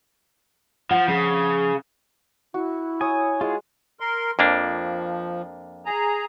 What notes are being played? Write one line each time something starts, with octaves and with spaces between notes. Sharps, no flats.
F3 F#5
C#3 F3
E4 F#4
C#5 G#5 D#6
G#3 F4 G#4
A#4 C6
F2 F3 A#3 D4
G#4 A#5